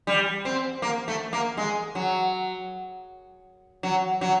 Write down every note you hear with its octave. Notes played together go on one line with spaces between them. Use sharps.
G3
C4
A#3
A3
A#3
G#3
F#3
F#3
F#3